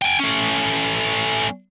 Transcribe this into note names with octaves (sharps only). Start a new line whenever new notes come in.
G5 G#5
A3 C#4